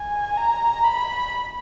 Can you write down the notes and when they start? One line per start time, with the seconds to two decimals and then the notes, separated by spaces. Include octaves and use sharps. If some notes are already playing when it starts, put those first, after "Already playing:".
Already playing: G#5
0.38 A#5
0.84 B5